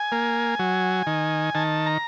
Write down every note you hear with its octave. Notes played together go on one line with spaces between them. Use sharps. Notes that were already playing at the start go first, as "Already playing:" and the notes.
Already playing: G#5
A#3
F#3
D#3
D#3 A5
A#5